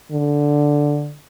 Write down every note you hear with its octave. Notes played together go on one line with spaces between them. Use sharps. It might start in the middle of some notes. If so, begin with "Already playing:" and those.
D3